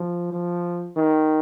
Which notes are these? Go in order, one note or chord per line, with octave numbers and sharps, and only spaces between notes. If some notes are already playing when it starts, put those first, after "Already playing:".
Already playing: F3
F3
D#3